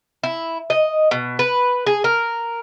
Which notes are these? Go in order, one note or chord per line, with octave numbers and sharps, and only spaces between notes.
E4
D#5
B2
B4
G#4
A#4